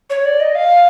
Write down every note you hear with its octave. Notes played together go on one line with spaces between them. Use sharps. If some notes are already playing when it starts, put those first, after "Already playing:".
C#5
D5
D#5
F5